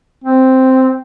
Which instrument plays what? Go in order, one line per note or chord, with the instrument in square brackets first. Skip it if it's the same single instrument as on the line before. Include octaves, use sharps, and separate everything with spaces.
[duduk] C4